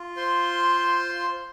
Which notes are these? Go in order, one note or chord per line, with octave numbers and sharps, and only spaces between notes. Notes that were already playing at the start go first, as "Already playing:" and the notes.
Already playing: F4
C5 C6